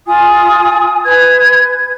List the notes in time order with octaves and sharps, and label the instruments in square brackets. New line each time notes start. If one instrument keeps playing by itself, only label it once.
[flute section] F4 G#5 D#6
B4 G#6